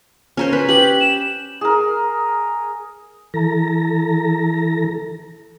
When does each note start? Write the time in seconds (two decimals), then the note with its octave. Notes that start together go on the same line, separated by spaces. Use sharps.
0.37 C#4 A#4 C5
0.53 B4
0.69 G4 F#7
1.01 E7
1.61 G#4 A#4
3.34 E3 A4 A#5